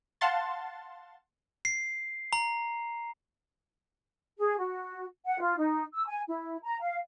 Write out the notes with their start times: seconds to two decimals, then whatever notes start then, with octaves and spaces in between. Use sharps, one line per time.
0.21 F5 F#5 A5 C6 A6
1.65 C7
2.33 A#5
4.38 G#4
4.58 F#4
5.26 F#5
5.39 F4
5.57 D#4
5.92 E6
6.07 G#5
6.28 E4
6.63 A#5
6.80 F5